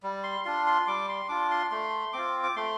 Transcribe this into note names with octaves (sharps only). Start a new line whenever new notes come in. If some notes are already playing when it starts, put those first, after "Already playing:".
G3
C6
D4 F4 C6
C6
G3 D6
C6
D4 F4 D6
C6
A3 C6
C4 F4 D6
D6
A3 C6